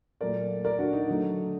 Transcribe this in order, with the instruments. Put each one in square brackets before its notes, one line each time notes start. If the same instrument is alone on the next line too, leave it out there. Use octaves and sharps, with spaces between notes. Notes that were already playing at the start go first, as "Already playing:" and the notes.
[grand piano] A#2 F#3 A3 A#4 D5
A#4 D5
D4 F#4
D#4
D3 F#3 A3